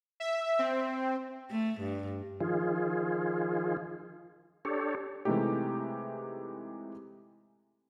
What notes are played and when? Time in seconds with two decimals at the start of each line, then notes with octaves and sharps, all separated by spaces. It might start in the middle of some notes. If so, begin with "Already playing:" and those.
0.20 E5
0.59 C4
1.50 A3
1.81 G2
2.40 D#3 F3 F4 G#4
4.65 D4 G4 A4 C#5
5.25 C3 E3 G#3 A3 D#4 G4